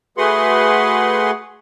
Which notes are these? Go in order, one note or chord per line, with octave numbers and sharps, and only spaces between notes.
A3 F#4 G#4 B4 F#5 C6